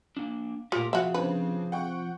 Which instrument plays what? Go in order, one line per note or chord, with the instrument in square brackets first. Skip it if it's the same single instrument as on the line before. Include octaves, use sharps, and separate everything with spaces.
[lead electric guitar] A#3 D4
[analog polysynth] A#2 A3 [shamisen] F4 [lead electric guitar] G4 A#4
[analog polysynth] C3 F3 [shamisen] F#4 E5 [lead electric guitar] G#4 F5
[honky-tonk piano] C#3 C4 D4 [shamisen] B4
[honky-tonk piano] F#5 G5 C#6